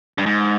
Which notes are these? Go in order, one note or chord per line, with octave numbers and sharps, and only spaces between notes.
G2
G#2